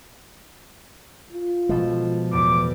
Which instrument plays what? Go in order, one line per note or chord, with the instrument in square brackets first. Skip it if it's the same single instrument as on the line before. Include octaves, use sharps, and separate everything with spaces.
[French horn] F4
[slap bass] B2 G#3 [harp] F3 A4
[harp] E2 A2 [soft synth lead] D6